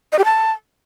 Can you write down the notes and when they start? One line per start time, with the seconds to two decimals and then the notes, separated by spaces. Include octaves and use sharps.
0.12 D#5
0.18 G4
0.25 A5